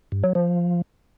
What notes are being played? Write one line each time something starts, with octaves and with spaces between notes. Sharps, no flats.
G2
F#3
F3